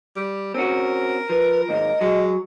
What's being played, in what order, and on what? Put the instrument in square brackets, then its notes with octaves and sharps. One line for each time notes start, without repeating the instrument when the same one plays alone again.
[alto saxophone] G3
[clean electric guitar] C4 C#4 F#4 [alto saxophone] A#4
[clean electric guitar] F3 [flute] B4
[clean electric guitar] D#2 G#2 [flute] D#5
[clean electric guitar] F#3 [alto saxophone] G#3